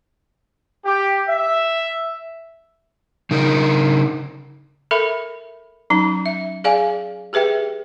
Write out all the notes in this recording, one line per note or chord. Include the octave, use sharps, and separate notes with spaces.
G4
E5
C#3 D#4 A#4
A4 A#4 E5 B5
F#3 C#4 D#4 A#5
E5
G#4 D5 F5 G#5
G4 G#4 B4 E5 G5